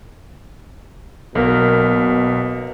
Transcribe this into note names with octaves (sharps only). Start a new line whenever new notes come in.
B1 B2 A#3